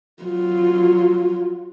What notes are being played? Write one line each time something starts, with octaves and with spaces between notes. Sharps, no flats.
F#3 F4